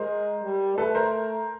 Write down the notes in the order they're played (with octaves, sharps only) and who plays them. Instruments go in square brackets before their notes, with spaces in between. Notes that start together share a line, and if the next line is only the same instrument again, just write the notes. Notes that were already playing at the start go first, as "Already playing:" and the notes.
Already playing: [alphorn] G#3 [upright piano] A#4 C5
[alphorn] G3
[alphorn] A3 [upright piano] A4 B4
[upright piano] A#4 C5